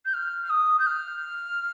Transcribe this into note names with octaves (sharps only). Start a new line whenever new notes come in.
G6
F6
F6
D#6
G6
F6